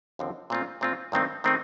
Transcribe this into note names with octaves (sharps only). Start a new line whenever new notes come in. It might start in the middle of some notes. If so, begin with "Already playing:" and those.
D#2 D3 F3 C4
A#2 A3 C4 F4
A#2 A3 C4 F4
G2 D#3 A3 C4 D#4
D#3 A3 C4 D#4